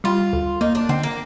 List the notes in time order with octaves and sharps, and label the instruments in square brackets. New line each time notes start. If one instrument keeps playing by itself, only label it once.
[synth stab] G3 [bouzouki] F4
[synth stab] D2
[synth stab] A#3 [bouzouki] D#4
[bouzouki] D4
[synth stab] D3 [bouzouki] C4
[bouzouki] A#3